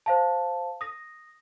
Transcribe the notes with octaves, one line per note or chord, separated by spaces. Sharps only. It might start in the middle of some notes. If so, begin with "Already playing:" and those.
C5 F5 A5
D#6 A#6